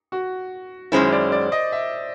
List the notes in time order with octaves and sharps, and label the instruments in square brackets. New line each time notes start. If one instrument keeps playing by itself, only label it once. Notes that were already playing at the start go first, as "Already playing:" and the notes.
[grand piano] F#4
[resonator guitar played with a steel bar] F#2 D#3 G#3 C#4 E4 [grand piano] C5
[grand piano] D5
D5
D#5
E5